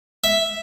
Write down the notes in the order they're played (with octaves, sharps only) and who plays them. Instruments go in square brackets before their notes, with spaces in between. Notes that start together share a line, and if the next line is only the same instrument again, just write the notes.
[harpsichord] E5